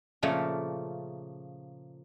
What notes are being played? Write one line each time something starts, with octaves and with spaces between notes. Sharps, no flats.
A#2 C#3 F3 A3 A#3